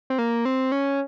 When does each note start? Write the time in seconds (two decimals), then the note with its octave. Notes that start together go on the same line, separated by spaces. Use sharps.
0.10 C4
0.18 A#3
0.45 C4
0.72 C#4